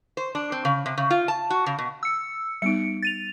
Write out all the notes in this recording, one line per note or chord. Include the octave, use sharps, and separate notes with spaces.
C5
D4
C4
C#3
C3
C#3
F4
A5
F#4
C#3
B2
E6 C#7
G3 B3 D#4 C#7 D7
A6 D#7 F7